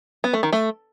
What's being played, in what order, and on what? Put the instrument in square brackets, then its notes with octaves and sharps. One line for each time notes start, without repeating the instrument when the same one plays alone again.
[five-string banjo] B3
A3
D#3
A3